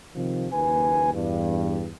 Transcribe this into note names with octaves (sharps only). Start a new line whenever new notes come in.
C3 D#3 F3
F#1 D#2 B4 G#5
E2 G2